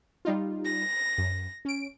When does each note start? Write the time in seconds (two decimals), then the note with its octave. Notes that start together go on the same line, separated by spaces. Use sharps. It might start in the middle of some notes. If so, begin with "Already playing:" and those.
0.25 G3 D#4 F4
0.65 A#6
1.18 F#2
1.65 C#4 D7